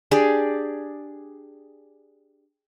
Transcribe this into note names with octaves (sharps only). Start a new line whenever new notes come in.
D4 G4 G#4 D5